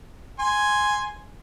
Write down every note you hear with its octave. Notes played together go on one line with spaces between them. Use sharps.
G#5 C6